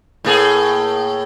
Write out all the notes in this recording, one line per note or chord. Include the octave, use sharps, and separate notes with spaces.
A2 A#3 G#4